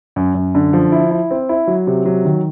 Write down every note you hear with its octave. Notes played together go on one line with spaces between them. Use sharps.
F#2
F#2
D3
F3
E4
E4
C4
E4
F#3
C3
F#3
D#3